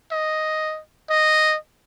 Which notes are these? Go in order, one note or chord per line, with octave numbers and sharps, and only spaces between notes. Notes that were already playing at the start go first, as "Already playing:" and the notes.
D#5
D#5